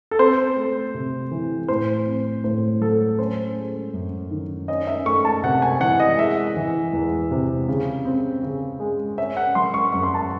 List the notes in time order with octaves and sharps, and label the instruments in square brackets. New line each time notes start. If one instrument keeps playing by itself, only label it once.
[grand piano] A4
C4 C5
A3
C3
E3
A2 C5
C4
A2 C5
F#3 A4
C#4 C5
G#3
F#2
D#3
C#4 D#5
E5
A3 C#6
A5
C3 F#5
G#5
E3 F#5
D#5
G#3 E5
E3
E2
C3
C#3
C4
C#3
G#3
C#4 E5
F#5
F#3 C6
C#6
F#2 C#6
C6
A5